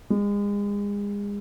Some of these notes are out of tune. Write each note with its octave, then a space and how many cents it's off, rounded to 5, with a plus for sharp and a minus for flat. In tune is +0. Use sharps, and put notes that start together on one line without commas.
G#3 -35